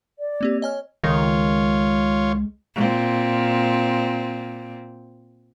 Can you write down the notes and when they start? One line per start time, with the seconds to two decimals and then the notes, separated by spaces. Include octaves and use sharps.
0.19 D5
0.41 A#3 C4 G4
0.62 C#5 D#5 G#5 F6
1.04 C#2 D#3 G#3 F4 C#5
2.75 A#2 C4